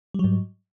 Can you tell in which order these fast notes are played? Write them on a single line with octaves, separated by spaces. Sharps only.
G3 F#3 G#2